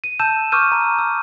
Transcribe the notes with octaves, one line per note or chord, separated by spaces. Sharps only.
D#7
A5 E6 G6 E7
C#6 D6 E6 F6 G6 D#7
A#5
E6